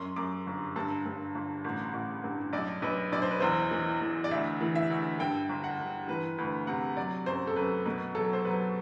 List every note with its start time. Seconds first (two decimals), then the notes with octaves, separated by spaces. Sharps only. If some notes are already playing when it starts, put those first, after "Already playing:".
Already playing: F#2 C6
0.16 F#2 D6
0.47 G1
0.76 G2 A5
1.06 G2
1.35 G1
1.64 A1
1.94 A1
2.24 G2
2.53 B1 D5
2.82 B1 B4
3.12 B1 D5
3.22 C5
3.31 B4
3.40 E2 C5
3.71 E3
4.01 E2
4.24 D5
4.31 D2 E5
4.61 E3
4.75 E5
4.90 D2
5.19 G2 G5
5.49 G1
5.64 F#5
5.79 G1
6.08 E3 B4
6.38 D2 B4
6.67 C3 F#5
6.97 F#3 D5
7.26 F#2 C5
7.47 A4
7.56 F#2 B4
7.85 B2 B4
8.15 F#3 A4
8.33 C5
8.45 F#3 B4